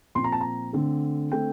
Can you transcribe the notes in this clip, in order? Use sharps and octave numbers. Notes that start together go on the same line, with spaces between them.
A#2 F3 C4 C6
A#5
A5
A#5
D3 A3 C4
D3 A3 C4 G5